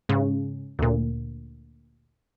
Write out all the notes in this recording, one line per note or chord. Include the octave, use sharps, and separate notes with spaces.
G#2 C#3
D2 A#2